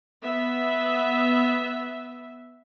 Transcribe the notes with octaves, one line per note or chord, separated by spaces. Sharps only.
B3 E5